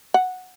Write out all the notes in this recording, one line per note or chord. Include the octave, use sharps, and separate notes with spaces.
F#5